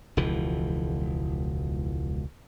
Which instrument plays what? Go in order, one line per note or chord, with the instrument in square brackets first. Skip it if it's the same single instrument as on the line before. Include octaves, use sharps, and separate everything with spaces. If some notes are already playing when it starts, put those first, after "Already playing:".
[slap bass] E1 C#2 E3 F3